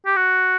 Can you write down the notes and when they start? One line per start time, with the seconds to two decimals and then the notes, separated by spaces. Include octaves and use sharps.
0.06 G4
0.16 F#4